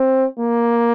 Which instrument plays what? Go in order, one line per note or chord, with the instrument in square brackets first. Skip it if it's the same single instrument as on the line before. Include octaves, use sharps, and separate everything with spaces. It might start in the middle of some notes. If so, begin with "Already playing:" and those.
Already playing: [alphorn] C4
A#3